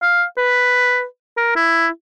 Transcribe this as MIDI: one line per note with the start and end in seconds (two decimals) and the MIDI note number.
0.02 0.24 77
0.38 1.05 71
1.37 1.52 70
1.56 1.88 64